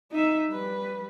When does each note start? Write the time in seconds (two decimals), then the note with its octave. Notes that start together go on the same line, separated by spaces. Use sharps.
0.11 D#4 E5
0.49 G3 B4